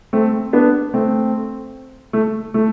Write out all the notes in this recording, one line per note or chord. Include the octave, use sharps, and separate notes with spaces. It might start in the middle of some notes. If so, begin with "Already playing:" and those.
A3 C4
B3 D4
A3 C4
A3
A3